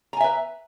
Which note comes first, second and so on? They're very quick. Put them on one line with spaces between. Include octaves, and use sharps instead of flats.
A#5 G#5 E5 B4